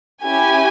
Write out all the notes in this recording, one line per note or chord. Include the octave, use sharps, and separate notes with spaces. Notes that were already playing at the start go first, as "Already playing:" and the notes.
C#4 E4 G4 G#5